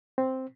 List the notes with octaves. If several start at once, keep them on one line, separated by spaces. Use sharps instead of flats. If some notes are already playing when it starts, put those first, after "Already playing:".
C4